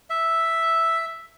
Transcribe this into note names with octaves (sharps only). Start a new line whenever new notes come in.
E5